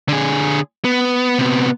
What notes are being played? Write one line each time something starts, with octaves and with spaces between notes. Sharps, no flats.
D3 G#4
B3
C3 B3